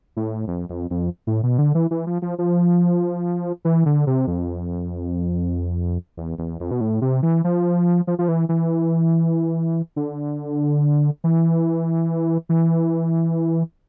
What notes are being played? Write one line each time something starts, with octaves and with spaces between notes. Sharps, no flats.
A2
F2
F2
F2
A2
B2
D3
E3
E3
F3
F3
F3
E3
D3
C3
F2
E2
E2
F2
B2
A2
C3
E3
F3
F3
F3
E3
E3
D3
E3
E3